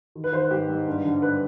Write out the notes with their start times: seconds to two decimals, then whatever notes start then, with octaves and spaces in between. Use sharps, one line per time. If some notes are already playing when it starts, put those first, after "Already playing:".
0.15 D#3
0.24 B4
0.32 D#3 C5
0.42 B4
0.51 G#2 G4
0.68 G#2
0.87 G2
1.05 D3
1.22 G2 B4